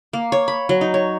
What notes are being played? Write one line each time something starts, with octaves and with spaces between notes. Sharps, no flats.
A#3
C#5
B5
F#3
D#4
C#5